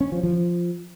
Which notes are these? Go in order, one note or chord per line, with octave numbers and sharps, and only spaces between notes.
C#4
F3
F3